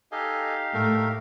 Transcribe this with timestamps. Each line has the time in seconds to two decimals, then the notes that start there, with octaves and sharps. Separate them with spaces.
0.12 D#4 G4 A4 D#5 F5 G#5
0.74 A2 A3 A4 A#4